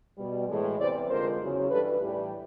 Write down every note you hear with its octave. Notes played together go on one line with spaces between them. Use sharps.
B2 G3
A2 E3 G#3
E2 C3 E3 G3 C5 D5
F2 D3 F3 G#3 A#4 C5
E2 C#3 F#3
G2 E3 G3 A4 B4
A2 E3 G3